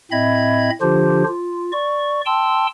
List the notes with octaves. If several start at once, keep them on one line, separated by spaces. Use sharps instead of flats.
A2 C4 D#5 E5 B5 G#6
D3 F3 D4 F4 G4 C5
F4
D5 C#6
G5 A5 C6 E6